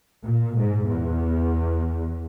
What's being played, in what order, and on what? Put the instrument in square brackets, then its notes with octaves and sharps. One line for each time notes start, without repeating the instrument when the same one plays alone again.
[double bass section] A#2
G#2
E2